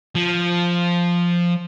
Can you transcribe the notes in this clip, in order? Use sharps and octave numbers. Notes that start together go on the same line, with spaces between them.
F3